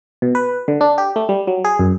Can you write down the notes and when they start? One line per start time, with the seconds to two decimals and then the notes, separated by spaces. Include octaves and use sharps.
0.22 B2
0.35 B4
0.68 D3
0.81 D4
0.98 G4
1.16 A3
1.29 G3
1.47 F#3
1.65 G#4
1.79 F#2